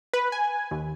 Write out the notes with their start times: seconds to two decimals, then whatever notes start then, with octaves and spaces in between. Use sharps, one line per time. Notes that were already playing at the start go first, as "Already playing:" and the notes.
0.13 B4
0.32 G#5
0.71 D#2